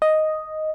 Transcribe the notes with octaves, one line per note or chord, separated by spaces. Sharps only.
D#5